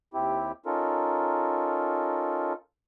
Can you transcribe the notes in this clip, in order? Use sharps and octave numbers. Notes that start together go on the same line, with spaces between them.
D#2 C4 E4 G4
C#4 D#4 F4 A4 A#4